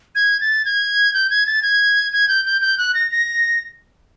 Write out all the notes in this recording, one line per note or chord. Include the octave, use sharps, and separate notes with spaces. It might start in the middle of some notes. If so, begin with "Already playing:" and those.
G#6
A6
G#6
G6
G#6
A6
G#6
G#6
G6
G6
G6
F#6
A#6
A#6